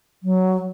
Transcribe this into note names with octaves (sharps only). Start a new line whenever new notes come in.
F#3